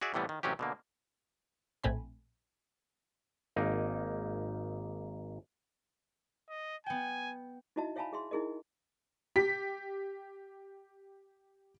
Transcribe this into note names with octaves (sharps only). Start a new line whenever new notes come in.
F#4 G#4 D5 E5
A2 C3 E3 G3 B3
D#3
A1 C3 F#3 C#4 G4
B2 D3 A#3
A#1 A2 A3 C4 G#5 B5
G#1 A#3 D#4
D#5
B3 G5 G#5
D#4 E4 F#4 D#5 E5 A5
C#5 E5 F5 G#5 A5 B5
G#4 E5 C6
D#4 E4 G#4 A#4 D#5
G4 B6